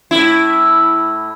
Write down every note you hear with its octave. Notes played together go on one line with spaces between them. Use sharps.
A2 E4